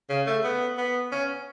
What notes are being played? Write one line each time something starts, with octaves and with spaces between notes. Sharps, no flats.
C#3
A3
B3
B3
C#4